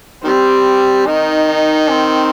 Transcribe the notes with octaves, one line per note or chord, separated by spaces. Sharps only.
D#3 G3 C4
D#3 D#4
D#4
C4